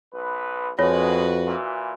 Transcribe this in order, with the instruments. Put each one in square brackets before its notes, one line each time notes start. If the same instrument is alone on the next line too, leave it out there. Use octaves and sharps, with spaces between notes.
[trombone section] B1 B4
[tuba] F2 [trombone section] B2 G#3 [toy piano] F4 C#5 [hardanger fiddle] F#4 B4
[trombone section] A#2 E3